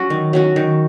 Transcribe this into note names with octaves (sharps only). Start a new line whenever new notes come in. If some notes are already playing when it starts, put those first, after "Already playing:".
Already playing: F#3 C#4 F#4
D#3
F#3 C#4 F#4
D#3